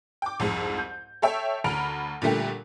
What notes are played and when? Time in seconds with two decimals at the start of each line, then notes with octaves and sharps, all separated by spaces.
0.22 G5 D6
0.40 C2 F2 G#2
0.77 G6
1.22 A4 C#5 E5 G5
1.64 D2 A#5 B5 F6 D7 F7
2.22 A#2 D3 G3 A3 G4